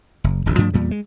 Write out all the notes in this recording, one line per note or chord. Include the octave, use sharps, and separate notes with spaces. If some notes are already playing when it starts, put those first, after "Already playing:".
F#1
D1 A1 D2
G2 F3 A3 D4
E2 A#2 G3
G#3